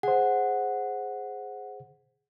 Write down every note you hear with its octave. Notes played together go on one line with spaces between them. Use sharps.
G#4 C5 F#5